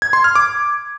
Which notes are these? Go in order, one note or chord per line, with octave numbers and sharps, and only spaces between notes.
G#6
C6
F6
D6